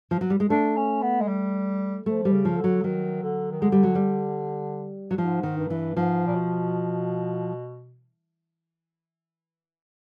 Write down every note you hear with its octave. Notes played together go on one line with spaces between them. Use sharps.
F3
F#3
G3
G#3
A3 D4
C#4
B3
G#3
G3
F3 A3
G3
C#3
F3
D3
F#3
D#3 F#3
D3
D#3
D3 G#3
G3
F#3
G3
F#3
G#2 F3
D#3
G2
E3
G#2 F3
A#2
B2